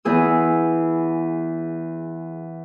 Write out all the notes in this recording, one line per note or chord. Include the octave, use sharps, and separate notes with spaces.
E2 B3 G#4 E6